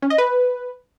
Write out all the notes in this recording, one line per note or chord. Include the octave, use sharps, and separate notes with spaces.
C#4
D#5
B4